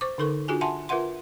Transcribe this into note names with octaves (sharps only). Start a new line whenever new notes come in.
C5 C#6 D6
D3 D#4 A4 A#4 C#6
D4 F4 F#4 G#4 G#5
E5 F#5 G#5 A5 C6
F4 A#4 B4 E5 F#5 C6